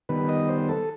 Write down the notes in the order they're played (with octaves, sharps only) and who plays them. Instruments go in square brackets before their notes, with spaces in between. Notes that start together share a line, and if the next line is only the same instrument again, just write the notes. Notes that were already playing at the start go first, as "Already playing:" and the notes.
[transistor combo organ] D#3 G3 B3 B4
D#5
C5
A4